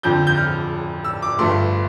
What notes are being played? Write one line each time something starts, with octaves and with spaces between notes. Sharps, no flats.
F2 D3 F3 G6
G6
F6
E6
D6
G1 G2 F3 A3 C6